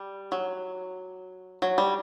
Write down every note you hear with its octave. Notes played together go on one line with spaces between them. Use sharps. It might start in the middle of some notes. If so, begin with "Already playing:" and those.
Already playing: G3
F#3
F#3
G3